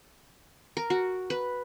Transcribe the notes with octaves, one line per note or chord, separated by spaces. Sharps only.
A#4
F#4
B4